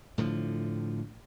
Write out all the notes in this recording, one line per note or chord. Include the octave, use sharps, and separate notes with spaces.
A2 D3 F3